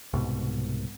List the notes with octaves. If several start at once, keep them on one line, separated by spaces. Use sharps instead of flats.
C2 G#2 B2